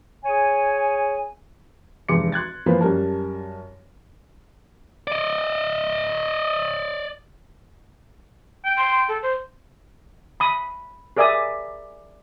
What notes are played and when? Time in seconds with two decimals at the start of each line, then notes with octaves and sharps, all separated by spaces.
0.24 G#4 C#5 G#5
2.09 F1 E2 G#3 C6 D6 C#7
2.32 C6 F#6 G#6 A6
2.66 E3 F3 A#3 F4 B4 C5
2.81 F#2 G3 A#4 A5
5.07 D5 D#5
8.64 G5
8.78 C6
9.09 A4
9.23 C5
10.40 B5 D#6
11.17 G#4 A#4 D5 E5 G#5 D#6